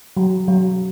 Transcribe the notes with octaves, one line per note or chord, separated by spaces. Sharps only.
F#3
F#3